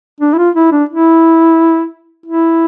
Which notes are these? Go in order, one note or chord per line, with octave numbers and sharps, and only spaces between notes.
D4
E4
F4
E4
D4
E4
E4